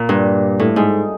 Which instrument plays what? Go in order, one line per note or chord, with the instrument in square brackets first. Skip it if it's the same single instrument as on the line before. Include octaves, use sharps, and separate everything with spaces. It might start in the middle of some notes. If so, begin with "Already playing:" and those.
Already playing: [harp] A#2
G2
A2
G#2